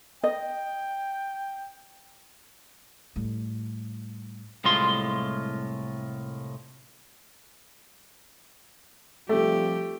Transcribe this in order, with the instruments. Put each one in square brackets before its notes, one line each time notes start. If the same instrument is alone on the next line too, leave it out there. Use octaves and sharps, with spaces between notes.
[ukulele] D#5 [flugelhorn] G5
[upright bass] A2 G3
[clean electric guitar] C2 A2 G#3 F4 C6
[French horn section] F3 G3 C4 [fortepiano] A3 [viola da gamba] G4